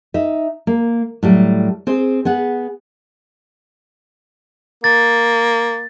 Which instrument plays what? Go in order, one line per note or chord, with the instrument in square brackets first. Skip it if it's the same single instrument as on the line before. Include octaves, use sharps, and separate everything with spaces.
[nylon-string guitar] D#4 E5
A#3
A2 F#3 G3
C4 G#4 C5
B3 G#4 F#5
[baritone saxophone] A#3 [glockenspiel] A6